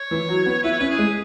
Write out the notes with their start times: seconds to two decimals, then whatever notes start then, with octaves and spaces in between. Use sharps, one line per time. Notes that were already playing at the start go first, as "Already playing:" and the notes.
Already playing: C#5
0.11 E3
0.29 F#3
0.46 B3
0.63 E4 B4
0.71 C#5
0.80 C#4 B4
0.90 G#4
0.98 G#3